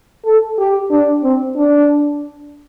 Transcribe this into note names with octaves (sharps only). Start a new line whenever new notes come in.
A4
G4
D4
C4
D4